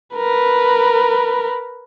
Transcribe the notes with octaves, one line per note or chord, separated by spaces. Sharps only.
A#4 B4